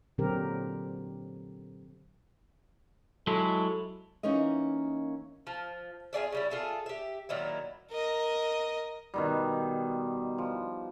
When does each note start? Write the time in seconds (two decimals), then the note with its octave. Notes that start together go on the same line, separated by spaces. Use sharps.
0.18 A#2 D3 F#3 C4 G4 A#4
3.27 F#3 G#3 E4 A4
4.23 E3 A#3 C#4 D#4 A#4 D#5
5.47 F3
6.13 F4 G#4 D5 E5
6.32 C#3 G3 E4
6.50 F4 G#4 A4 E5
6.86 G4 E5
7.29 A#2 D#3 F#3 E4
7.91 A#4 D#5
9.14 B2 D#3 G3
10.38 F3